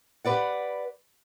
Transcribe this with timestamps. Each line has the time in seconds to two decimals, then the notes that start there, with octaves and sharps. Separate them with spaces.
0.24 G4 B4 D5 F#5